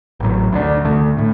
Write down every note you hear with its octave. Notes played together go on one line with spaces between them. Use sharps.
A1 A2 F#3
D2 D3 B3 D4
D2 D3 A3 D4
A2 A3